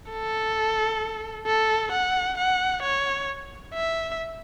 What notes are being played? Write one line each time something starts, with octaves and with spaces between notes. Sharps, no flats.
A4
A4
F#5
F#5
C#5
E5